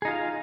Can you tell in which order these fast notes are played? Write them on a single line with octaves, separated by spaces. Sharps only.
G#4 D#4 F4 F5